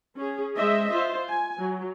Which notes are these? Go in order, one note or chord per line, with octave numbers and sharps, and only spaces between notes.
C#4 G#4
G#3 C5 D#5 E5
F4 C5
G#5
F#3